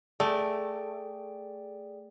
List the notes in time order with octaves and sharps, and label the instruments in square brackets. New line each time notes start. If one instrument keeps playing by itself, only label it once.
[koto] A3 [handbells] G#4 D5 G5